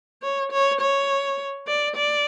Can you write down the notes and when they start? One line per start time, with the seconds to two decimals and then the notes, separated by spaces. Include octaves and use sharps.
0.22 C#5
0.52 C#5
0.81 C#5
1.68 D5
1.96 D5